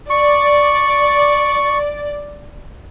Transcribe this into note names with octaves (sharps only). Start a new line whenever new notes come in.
D5 C#6